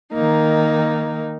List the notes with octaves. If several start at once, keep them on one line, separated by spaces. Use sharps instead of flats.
D#3 A#3 D#4